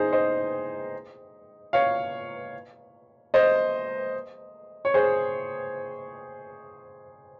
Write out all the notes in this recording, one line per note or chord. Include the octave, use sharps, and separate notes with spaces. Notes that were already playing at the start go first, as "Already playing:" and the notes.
Already playing: D#4 G#4 C5
C5 D#5
C#5 F5
C5 D#5
C#5
G#4 C5